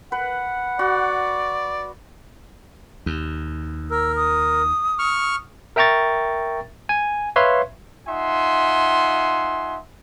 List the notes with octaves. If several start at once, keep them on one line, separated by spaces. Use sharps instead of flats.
B4 F#5
F#4 D5
D#2
A#4 E6
D#6
C#6 F6
A#4 E5 G5 A#5 C#6 A6
G#5
B4 C#5 E5 F5 C6
D#4 F4 E5 F#5 G#5 C6